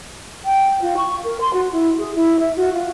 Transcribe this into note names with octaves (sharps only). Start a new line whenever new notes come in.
G5
F4
C#6
A#4
C6
F#4
E4
G#4
E4
E5
F#4
F4